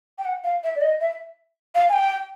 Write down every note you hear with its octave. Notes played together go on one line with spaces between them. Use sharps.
G5
F#5
F5
E5
D5
D#5
E5
F5
G#5
G5